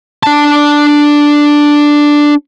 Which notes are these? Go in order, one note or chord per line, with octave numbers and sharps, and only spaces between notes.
D4 A5